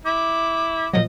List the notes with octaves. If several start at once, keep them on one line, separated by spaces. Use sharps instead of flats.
E4 D6
A#2 F3 F#3 D#5